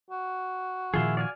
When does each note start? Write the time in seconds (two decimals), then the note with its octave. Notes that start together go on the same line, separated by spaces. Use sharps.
0.11 F#4
0.94 A#2 D#3 F3 E4 F4 G#4
1.17 D5 F5 G#5